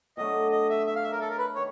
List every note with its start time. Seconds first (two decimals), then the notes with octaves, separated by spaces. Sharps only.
0.17 B2 F#3 A3 D4 D#5
0.52 D#5
0.70 E5
0.86 E5
0.96 F5
1.03 E5
1.12 A#4
1.20 A4
1.29 A#4
1.38 B4
1.55 D#3 C#5